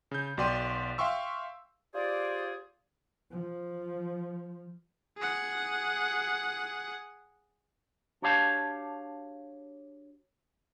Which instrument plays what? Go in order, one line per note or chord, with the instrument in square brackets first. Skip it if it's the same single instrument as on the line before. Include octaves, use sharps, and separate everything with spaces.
[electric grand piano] C#3 G6
B1 F#4 D5 G5 C6 D#7
E5 F5 G5 C6 C#6 E6
[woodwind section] F4 G4 G#4 C5 D5
[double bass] F3
[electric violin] G#4 F#5
[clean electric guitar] D4 F#4 G4 C#5 F5 A5